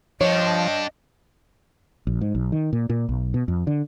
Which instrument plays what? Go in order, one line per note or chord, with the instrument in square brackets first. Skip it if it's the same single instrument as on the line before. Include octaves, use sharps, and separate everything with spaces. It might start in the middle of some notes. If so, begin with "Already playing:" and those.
[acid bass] F3 [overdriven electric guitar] D4 G4 [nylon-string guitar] C#5 [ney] D#5
[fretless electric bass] A#1
G#2
B1
D#3
A#2
A#2
B1
B2
F2
D3